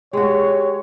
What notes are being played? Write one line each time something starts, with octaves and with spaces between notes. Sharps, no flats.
G#3 F#4 G4 C#5